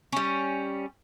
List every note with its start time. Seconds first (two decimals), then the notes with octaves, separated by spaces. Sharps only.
0.12 G3 C#4